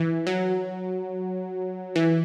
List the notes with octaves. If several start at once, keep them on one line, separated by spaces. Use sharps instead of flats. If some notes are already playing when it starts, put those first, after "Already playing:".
Already playing: E3
F#3
E3